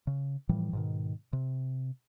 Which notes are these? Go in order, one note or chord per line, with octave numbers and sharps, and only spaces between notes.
C#3
A2 E3 F3 G3
G#2 B2 D#3
C3